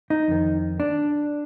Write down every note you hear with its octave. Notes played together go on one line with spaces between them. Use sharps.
D#4
F2 D#3
D4